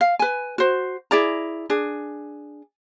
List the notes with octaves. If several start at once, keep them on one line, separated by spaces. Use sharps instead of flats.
F5
B4 G#5
F#4 C5
E4 G#4 D5 A#5
D4 G#4